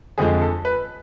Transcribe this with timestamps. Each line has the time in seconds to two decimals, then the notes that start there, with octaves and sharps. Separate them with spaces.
0.18 F2 D3 F3 G#3 G#4
0.42 A4
0.65 B4